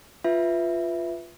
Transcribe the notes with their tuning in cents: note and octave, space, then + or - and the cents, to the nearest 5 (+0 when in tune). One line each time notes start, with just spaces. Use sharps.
F4 -5 B4 +0 E5 +0